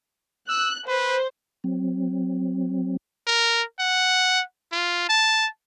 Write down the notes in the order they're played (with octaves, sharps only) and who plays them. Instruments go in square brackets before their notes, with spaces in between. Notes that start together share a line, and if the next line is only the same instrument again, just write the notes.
[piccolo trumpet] E6 [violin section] F#6
[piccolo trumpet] B4 [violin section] C5
[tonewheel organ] F#3 C4
[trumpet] A#4
F#5
F4
A5